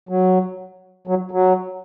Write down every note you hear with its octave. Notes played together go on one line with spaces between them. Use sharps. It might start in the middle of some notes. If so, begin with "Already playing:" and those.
F#3
F#3
F#3